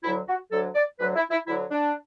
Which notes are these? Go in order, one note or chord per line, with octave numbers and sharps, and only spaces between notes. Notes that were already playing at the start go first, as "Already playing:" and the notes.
D2 D3 F#3 E4
F#4
D2 D3 F#3 A4
D5
D2 D3 F#3 B4
E4
E4
D2 D3 F#3 E4
D4